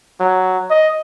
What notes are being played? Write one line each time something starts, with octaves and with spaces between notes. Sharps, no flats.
F#3
D#5